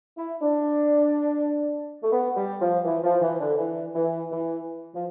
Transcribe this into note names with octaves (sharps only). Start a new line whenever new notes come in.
E4
D4
A3
B3
G3
F3
E3
F3
E3
D3
E3
E3
E3
F3